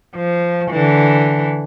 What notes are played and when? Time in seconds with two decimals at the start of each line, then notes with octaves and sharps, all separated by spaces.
0.15 F3
0.71 D3 E3